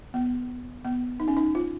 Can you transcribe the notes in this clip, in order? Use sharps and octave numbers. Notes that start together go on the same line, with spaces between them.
B3
B3
D#4
C#4
D#4
F4